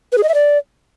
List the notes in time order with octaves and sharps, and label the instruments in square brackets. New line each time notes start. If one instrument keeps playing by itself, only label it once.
[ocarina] B4
G#4
D#5
E5
D5